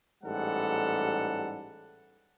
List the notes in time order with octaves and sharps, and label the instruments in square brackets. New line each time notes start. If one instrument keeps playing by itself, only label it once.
[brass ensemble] A1 G#2 G3 A4 F#5